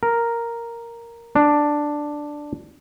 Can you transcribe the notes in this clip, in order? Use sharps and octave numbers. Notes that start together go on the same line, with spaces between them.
A#4
D4